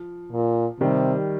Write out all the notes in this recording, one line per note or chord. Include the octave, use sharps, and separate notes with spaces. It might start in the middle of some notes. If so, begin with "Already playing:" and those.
Already playing: F3
A#2
C3 D#3 G3